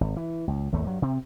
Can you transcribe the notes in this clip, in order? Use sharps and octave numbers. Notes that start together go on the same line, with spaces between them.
G#1
E3
C#2
G#1 D#2 A3
G2 F#3
C3 C4